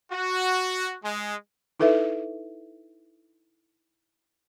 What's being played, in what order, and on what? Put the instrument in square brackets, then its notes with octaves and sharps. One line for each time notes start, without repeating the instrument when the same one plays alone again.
[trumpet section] F#4
G#3
[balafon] D#4 E4 A4 B4 E5